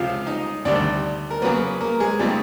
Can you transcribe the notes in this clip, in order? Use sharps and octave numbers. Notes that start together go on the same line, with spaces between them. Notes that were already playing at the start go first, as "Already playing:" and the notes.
Already playing: C#2 C3 F3 F4 F5
D#4 D#5
D2 C3 D#3 G3 D4 D5
A#4
C#3 F#3 A#3 B3 B4
A#3 A#4
G#3 G#4
C#3 F3 G3 A3 C4 D#4 G4